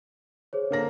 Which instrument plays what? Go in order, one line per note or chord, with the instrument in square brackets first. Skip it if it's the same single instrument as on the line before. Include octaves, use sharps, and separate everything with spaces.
[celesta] G#4 C5 C#5
[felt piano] D3 A#3 A#6